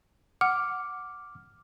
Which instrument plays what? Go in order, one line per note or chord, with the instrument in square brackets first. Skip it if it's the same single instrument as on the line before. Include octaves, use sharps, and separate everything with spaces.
[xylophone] F#5 [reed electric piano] D6 F6